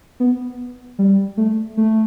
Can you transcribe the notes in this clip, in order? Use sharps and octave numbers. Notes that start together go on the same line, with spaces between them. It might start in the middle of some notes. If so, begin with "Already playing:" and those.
B3
G3
A3
A3